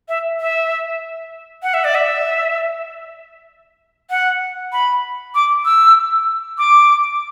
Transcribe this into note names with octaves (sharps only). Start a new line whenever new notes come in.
E5
E5
F#5
E5
D5
E5
F#5
B5
D6
E6
D6